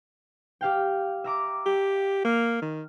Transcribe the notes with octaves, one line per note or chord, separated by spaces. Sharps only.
G4 F5 G5
E5 A#5 D6
G4
A#3 F6
D#3